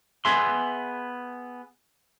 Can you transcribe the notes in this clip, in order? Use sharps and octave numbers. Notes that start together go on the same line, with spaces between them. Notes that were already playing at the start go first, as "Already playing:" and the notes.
B3 G#4 E5 C6